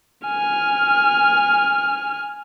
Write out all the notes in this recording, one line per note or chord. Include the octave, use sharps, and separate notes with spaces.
G#5 F6